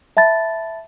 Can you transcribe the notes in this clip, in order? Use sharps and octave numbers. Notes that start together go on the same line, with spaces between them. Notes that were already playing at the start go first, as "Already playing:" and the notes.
E5 A5 B5 A6